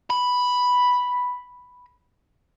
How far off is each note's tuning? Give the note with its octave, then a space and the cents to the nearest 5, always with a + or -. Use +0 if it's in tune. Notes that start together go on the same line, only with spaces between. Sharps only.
B5 +0